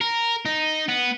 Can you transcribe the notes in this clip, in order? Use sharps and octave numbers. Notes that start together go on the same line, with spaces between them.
A#4
D#4
B3